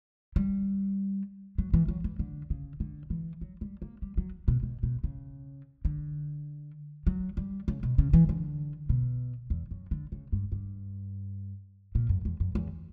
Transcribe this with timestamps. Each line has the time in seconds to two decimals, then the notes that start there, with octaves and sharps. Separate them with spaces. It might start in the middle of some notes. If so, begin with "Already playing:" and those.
0.36 G3
1.58 F#3
1.74 E3
1.88 F#3
2.04 E3
2.19 D3
2.50 C#3
2.80 D3
3.10 E3
3.41 F#3
3.61 G3
3.82 A#3
4.02 G3
4.17 F#3
4.48 B2
4.63 B2
4.83 B2
5.04 C#3
5.85 D3
7.07 F#3
7.37 G3
7.68 C#3
7.83 B2
7.98 C#3
8.13 E3
8.29 D3
8.89 B2
9.50 E2
9.71 F#2
9.91 D3
10.12 C#3
10.32 G2
10.52 G2
11.95 A#2
12.09 F#2
12.25 E2
12.40 F#2
12.55 E2